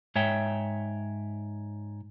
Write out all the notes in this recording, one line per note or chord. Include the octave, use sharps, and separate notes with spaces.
G#2 C#5 E5 G5